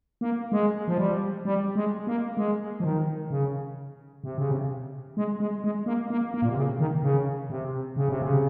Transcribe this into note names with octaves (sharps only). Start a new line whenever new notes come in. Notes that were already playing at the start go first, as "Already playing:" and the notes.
A#3
G#3
F3
G3
G3
G#3
A#3
G#3
F3
D#3
C#3
C3
C#3
C3
G#3
G#3
G#3
A#3
A#3
A#3
A#2
C3
C#3
D#3
C#3
C3
C#3
C3
C#3